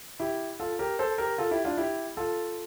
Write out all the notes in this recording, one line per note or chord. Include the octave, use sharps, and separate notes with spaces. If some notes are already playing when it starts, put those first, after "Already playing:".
E4 G4
F4 A4
G4 A#4
A4 C5
G4 A#4
F4 A4
E4 G4
D4 F4
E4 G4
F4 A4